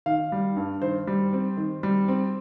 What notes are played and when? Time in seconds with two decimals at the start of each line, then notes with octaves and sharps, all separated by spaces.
0.06 D#3 F5
0.32 G3
0.57 G2
0.82 D#3 C5
1.07 G3
1.33 C4
1.57 D#3
1.83 G3
2.08 C4